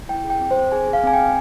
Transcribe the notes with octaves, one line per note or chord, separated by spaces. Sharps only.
E4 G5
G#4
G5
C4
C5
C4
G#4 G#5
G#4
F5
C4 G#5
G5
C4